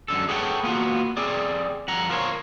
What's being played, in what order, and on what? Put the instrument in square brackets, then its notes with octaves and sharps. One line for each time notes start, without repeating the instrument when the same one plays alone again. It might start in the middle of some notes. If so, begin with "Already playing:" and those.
[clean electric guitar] F#2 D3 A4
G#4 A4 B4 C#5 F#5 G5
A#3 B3 F4 F#4
C4 G#4 D5
F2 F#5 A#5
F4 A#4 C5 C#5